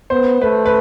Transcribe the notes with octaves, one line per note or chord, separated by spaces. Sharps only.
B3 C5
A3 B4
B4